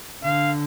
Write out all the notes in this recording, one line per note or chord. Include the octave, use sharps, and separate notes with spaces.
D3 F5